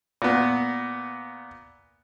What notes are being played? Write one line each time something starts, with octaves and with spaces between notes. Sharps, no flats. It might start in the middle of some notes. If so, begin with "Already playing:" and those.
A#2 B3